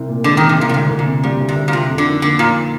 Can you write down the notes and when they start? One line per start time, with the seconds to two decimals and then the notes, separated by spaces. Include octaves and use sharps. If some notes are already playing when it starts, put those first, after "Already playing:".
Already playing: C2 C4
0.09 A#2
0.24 D3 G#3
0.37 D#3
0.41 C4
0.49 C3
0.58 C2 A#2
0.69 A#2
0.74 D2 G#2
0.90 D2
0.99 A#2
1.07 C3
1.23 A#2 G3
1.41 D2
1.49 C3
1.56 D2
1.68 A#2
1.73 C3 F4
1.90 F2
1.98 D3
2.06 D#3
2.22 D3 A#3
2.39 A#2 F4